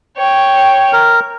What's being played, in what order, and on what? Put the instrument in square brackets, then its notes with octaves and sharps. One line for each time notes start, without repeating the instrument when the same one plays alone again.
[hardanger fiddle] C#5 G5
[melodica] A#4